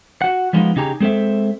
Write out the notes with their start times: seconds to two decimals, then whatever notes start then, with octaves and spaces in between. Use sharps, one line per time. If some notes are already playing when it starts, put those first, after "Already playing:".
0.22 F#4 F#5
0.53 F3 G3 G#3 B3 D#4 F4
0.76 C#3 D#4 G4 G#4 A#5
1.00 G#3 C4 A4 C5 E5